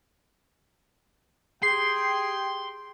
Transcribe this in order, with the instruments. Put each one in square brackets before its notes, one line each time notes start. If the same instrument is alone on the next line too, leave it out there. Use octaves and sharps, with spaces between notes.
[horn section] G4 G5 [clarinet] G#4 [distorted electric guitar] C6 [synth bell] C7